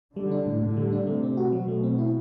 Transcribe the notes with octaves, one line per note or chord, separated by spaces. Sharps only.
D3 G3
D4
A2
A2 D3
G3
D4
C3 A3
C4
F#4
B2 F#3
A3
C4
E4